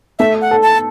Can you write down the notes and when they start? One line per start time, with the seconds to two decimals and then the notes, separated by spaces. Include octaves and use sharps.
0.19 A3 E5
0.41 F#5
0.51 A4
0.62 A5